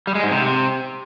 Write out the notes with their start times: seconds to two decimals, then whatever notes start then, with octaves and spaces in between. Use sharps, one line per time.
0.07 G3
0.15 G#3
0.23 G#2
0.31 C3